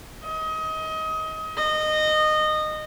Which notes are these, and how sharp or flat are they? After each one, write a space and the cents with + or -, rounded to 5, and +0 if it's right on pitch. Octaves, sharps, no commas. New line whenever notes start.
D#5 +25
D#5 -20